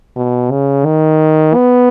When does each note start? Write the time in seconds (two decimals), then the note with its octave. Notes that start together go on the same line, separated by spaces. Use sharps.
0.16 B2
0.51 C#3
0.85 D#3
1.54 B3